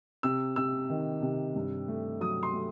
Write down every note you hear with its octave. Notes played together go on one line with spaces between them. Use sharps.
C3 E6
C3 E6
D#3
C3
G2
A3
F#3 D#6
C6
A3